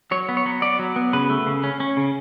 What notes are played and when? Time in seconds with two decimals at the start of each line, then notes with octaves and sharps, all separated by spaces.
0.11 F#3 C#5
0.29 B3
0.37 C#5
0.46 F#3
0.62 B3 D5
0.79 F#3
0.96 B3
1.13 C#3 B4
1.30 A3
1.47 C#3
1.63 C#4
1.80 C#4
1.97 C#3